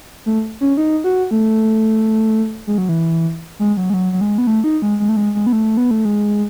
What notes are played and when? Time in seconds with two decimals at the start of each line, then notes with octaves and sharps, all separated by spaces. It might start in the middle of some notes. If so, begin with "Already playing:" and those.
0.26 A3
0.61 C#4
0.77 D#4
1.04 F#4
1.31 A3
2.67 G#3
2.78 F#3
2.89 E3
3.59 G#3
3.77 F#3
3.90 G#3
3.94 F#3
4.13 F#3
4.21 G#3
4.38 B3
4.47 A3
4.64 D#4
4.82 G#3
5.00 G#3
5.09 A3
5.16 G#3
5.35 G#3
5.47 B3
5.53 A3
5.77 B3
5.91 A3
6.05 G#3